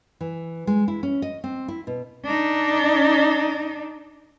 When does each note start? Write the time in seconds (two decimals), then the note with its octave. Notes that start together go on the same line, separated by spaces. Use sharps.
0.21 E3
0.67 G#3
0.88 E4
1.03 C#4
1.22 D#5
1.44 C4
1.68 E4
1.87 B2
2.25 D4 D#4